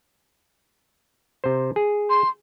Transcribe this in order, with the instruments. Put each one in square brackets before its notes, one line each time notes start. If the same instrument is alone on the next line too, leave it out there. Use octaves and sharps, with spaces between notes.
[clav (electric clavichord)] C3 C5
G#4
[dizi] C6